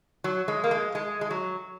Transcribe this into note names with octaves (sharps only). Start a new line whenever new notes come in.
F#3
G#3
A#3
G#3
G#3
G#3
F#3